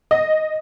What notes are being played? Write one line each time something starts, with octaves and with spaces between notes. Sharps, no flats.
D#5